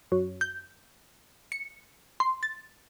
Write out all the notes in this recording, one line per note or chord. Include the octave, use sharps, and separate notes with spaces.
F#2
G6
C#7
C6
A6